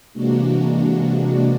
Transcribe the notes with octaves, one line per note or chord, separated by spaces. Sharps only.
C3 E3 G#3 A#3 D4 F#4